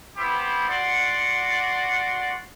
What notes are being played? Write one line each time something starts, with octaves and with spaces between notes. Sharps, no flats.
B3 E4 G4 C5
F#4 D5 F#5 C6